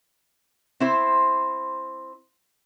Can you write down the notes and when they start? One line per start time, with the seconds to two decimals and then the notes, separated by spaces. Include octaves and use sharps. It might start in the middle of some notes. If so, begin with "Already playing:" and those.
0.80 C4 E4 C5